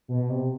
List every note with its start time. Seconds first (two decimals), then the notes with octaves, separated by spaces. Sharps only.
0.08 B2
0.30 C3